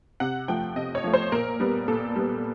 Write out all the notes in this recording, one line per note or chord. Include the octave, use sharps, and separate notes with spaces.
C3 F#5
F3 A3 G5
C3 D#5
C#5
F3 A3
C5
A#2 A#4
G3 B3
A#2 A4
G3 B3